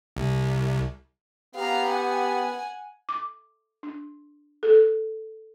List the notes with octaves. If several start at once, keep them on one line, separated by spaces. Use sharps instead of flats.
C2
B3 G4 F5 A#5
F#5 G#5
D6
D4
A4